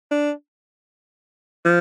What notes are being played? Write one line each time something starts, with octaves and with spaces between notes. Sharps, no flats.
D4
F3